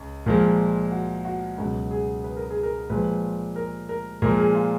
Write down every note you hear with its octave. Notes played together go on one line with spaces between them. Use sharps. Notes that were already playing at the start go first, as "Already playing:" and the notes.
Already playing: C#2
A#2 F3 G#3 A#4
F#4
F#4
C#2 B2 F#3 F#4
G#4
B4
A#4
G#4
A#4
A#2 F3 G#3 B4
A#4
A#4
A#2 F3 G#3 A#4
G#4
F4